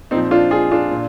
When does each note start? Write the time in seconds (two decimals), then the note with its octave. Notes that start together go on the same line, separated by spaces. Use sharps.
0.11 A#2 C4 D#4
0.16 F3
0.31 D4 F4
0.51 F4 G#4
0.71 D4 F4
0.91 A#2